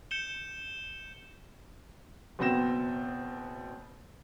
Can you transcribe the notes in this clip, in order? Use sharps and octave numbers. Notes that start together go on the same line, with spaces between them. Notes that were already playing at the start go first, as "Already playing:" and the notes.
G6 C#7 E7 G7
F#1 B2 B3 C4 A#6 E7